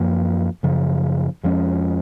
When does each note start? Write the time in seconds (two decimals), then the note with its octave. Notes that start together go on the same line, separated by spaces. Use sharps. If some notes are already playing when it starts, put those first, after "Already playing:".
Already playing: F#2 F3 A#3
0.63 F#2 C#3 F3
1.43 F2 F3 G#3 C#4